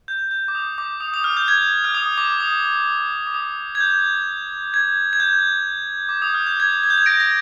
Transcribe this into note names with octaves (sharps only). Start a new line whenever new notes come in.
G6
G6
D6
D#6
D6
D#6
D#6
F6
G6
G#6
F6
D#6
D6
D#6
D6
D#6
G#6
G6
G#6
G#6
G6
D6
D#6
F6
G6
G#6
G#6
G6
G#6
A#6 D7
A#6